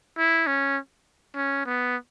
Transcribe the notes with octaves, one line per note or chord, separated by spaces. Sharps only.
E4
C#4
C#4
B3